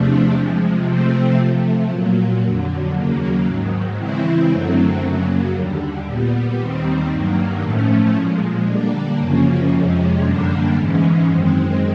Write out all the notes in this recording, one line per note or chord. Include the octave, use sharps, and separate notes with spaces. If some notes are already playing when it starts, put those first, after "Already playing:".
Already playing: E2 C3 F3 A3 D4
C3 F3 G#3
C3 F3 A3 C4
C3 F3 A3
A#2 F#3 A#3
F2 D3 F#3
D#2 C#3 F#3 A#3
G#2 D#3 F#3
C#3 E3 G#3 C4 E4
F#2 D3 F#3 A3 C4
F#2 C#3 F#3 A#3
D#2 D3 G3
A#2 G3 B3
D#2 D#3 G3 C4
G2 D#3 F#3 A#3
A2 F3 A3 C#4
A#2 F3 G#3
D3 G3 A#3 D4
F#2 C#3 F3 A#3 C#4
F2 C3 F3 G#3 C#4
F#2 D3 G3 A#3 D4
G#2 E3 G#3 C#4
F#2 D#3 G#3 C4